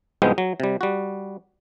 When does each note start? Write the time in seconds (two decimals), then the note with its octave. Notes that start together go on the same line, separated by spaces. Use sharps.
0.22 C2 G#2 F3 G#3 B3 G5
0.38 F#3
0.60 C3 G3
0.81 G3 F#4